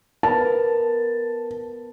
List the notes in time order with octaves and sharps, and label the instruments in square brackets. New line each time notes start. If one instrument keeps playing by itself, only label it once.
[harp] B3 A#4 [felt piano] A5